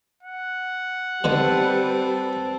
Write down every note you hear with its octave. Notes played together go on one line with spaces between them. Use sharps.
F#5
B2 D3 D#3 G3 C4 A4 B4